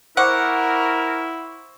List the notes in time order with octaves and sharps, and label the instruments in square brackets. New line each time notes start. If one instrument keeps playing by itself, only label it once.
[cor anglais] E4 [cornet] A#4 [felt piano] C5 C#6 D6 [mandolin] F#5